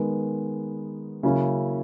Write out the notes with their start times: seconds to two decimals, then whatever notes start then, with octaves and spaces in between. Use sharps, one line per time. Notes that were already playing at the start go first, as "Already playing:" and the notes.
Already playing: D#3 G#3 B3
1.23 C#3 F#3 A#3 C#4 E4